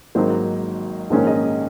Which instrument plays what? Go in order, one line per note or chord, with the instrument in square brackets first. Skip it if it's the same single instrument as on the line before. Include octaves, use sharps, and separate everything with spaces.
[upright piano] G#1 G#2 D#3 F#3 A#3 C5
A#1 G#2 D#3 A#3 C#4 C5
D#5